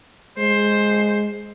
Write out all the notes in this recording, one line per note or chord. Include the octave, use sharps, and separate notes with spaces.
G#3 C5